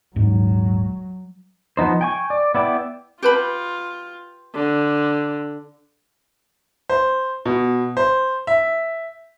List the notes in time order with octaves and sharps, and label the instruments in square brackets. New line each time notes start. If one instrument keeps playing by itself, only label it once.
[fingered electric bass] D#1 G#2 [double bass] F#3
[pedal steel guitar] F3 B3 D#4 C5
G5 G#5 C#6
D5
B3 E4 D5 G5
[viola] F4 [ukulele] G4 B4 B5
[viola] D3
[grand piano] C5
B2
C5
E5